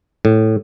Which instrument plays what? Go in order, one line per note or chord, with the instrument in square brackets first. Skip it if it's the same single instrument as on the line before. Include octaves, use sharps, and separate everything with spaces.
[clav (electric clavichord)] A2